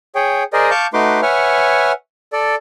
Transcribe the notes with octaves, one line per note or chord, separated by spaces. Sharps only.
G#4 C#5 G5
G#4 A#4 C5 D5 D#5
F5 A5 C#6 D6 G6
A3 D#4 F#4 B4 C6 D6
B4 C#5 E5 F#5 G#5 F6
A4 D5